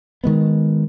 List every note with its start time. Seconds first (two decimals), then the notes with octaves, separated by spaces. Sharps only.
0.24 D#3 G#3 B3